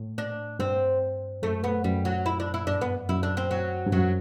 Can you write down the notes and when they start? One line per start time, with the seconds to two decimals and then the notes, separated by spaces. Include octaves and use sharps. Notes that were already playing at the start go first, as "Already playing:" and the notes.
Already playing: A2
0.18 D4
0.59 G2 C4
1.42 F#2 A3
1.64 B3
1.84 F#2 G3
2.05 F#3
2.26 E4
2.40 D4
2.54 E4
2.67 G2 D4
2.81 B3
3.09 F#2 E4
3.23 D4
3.37 C4
3.51 F#3
3.87 G2
3.92 F#2 F#3